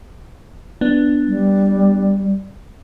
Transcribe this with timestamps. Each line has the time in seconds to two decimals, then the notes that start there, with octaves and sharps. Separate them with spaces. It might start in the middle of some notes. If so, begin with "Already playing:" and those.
0.81 B3 D4
1.28 G3